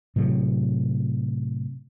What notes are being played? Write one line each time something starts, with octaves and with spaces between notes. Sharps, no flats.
A2 C3 F#3